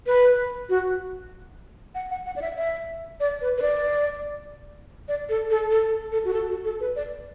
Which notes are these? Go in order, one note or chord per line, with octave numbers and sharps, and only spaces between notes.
B4
F#4
F#5
F#5
F#5
D5
E5
E5
D5
B4
B4
D5
D5
A4
A4
A4
A4
F#4
A4
F#4
A4
B4
D5